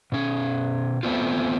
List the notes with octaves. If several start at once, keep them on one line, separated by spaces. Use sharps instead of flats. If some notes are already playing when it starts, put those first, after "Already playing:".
B2 C#4
A3 B3 C4 F4